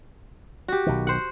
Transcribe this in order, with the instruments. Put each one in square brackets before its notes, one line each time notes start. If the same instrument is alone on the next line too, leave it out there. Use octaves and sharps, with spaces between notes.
[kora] F#4 G4
[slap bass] B1 D#3
[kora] C5 F#5